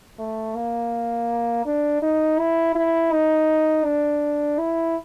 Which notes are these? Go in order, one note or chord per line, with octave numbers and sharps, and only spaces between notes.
A3
A#3
D4
D#4
E4
E4
D#4
D4
E4